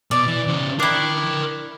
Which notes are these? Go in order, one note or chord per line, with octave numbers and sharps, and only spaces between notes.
B2 D5
E3
C#3 C5
D4 E4 A#4 G5